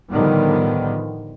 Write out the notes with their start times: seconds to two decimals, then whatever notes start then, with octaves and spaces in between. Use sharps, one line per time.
0.12 A2 D3 D#3 F3 G3 B3